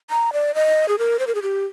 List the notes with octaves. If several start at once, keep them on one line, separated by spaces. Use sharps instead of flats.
A#5
D5
D#5
G#4
A#4
C5
A#4
G#4
G4